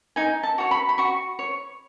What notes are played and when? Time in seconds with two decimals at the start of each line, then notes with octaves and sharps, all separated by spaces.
0.16 D#4 G#5
0.43 A5
0.58 F#4 C#5
0.71 B5
0.89 B5
0.98 F#4 C#6
1.39 C#5